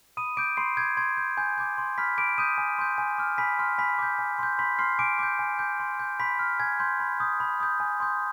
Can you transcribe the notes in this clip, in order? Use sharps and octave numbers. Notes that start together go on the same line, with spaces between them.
B5 D#6 D#7
D6 G6 D7
B5 C6 C7
D6 G6 G#6
C6 G#6
G6
G#5 G6
D6 G6
C6
B5 F6 B6
B5 D6 D7
D#6 G6 D#7
G#5
C6 G6
G#5
D6 F6
G#5 B5 B6
C6 F6
G#5 B5 B6
D6 G6
G#5
C6 G6
B5 C6 B6
C6 F6 C7
G#5 D6 D7
D6 G6
G#5
D6 G6
C6
G6
B5 C6 B6
F6
G#5 G#6
C6 G6
B5
D#6 G6
B5
D#6 G6
G#5
C6 D#6 G6